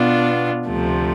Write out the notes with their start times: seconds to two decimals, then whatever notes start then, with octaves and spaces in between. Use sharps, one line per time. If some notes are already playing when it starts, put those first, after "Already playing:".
Already playing: B2 B3 D4 F4
0.67 D2 C3 F3 A3